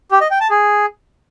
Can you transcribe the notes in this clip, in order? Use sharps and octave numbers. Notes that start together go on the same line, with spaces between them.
G4
D#5
G5
A5
G#4